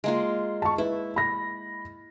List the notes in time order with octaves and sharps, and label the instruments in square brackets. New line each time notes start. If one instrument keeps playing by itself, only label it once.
[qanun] G#3 A#3 F4
[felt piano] A5 C#6
[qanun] E4 [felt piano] B4
[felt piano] B5 A#6